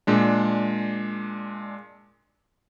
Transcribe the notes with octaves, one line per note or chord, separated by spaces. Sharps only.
A#2 G#3 D4